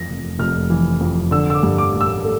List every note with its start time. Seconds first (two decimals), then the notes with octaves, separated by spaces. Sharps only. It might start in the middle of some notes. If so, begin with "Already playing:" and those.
Already playing: F2 E3 A#6
0.09 F1
0.39 F1 F6
0.70 E3
1.00 F2
1.31 D3 E6
1.50 E6
1.54 D6
1.63 G2
1.78 D6
1.93 A1
2.01 E6
2.24 A3